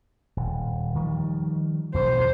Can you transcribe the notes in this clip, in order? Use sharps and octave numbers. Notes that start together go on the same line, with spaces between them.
D#1
D#3 F3 G3
E2 B2 F#3 C5